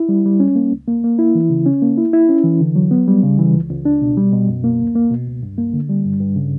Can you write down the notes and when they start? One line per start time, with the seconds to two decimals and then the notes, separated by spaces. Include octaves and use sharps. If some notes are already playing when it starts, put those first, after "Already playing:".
Already playing: E4
0.09 G3
0.25 G3
0.40 C#4
0.56 A#3
0.72 C#2
0.88 A#3
1.04 A#3
1.19 E4
1.35 E3
1.50 C#3
1.66 C#4
1.82 A#3
1.97 E4
2.13 E4
2.29 C#4
2.44 E3
2.60 D3
2.75 F#3
2.91 B3
3.08 G3
3.23 C#3
3.39 E3
3.54 C#2
3.70 C#2
3.85 D4
4.02 B2
4.17 G3
4.32 B2
4.48 F#2
4.64 A#3
4.80 D2
4.95 A#3
5.11 B2
5.27 C#2
5.43 G2
5.58 A#3
5.73 D3
5.89 G3
6.05 G2
6.20 G2
6.36 C#3